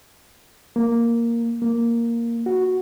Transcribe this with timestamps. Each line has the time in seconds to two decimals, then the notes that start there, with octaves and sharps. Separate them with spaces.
0.76 A#3
1.62 A#3
2.46 F#4